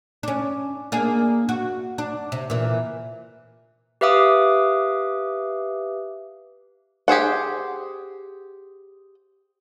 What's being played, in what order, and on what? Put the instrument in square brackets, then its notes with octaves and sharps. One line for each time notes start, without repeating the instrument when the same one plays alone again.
[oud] C#4 D4
A#3 D4 G#4
F#4
D4
C3
A#2 E3
[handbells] G4 B4 E5 F5 D6 D#6
[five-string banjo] G4 G#4 C5 F#5